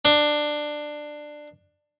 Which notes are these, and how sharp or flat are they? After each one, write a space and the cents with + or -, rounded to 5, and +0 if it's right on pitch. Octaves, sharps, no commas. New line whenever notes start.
D4 +15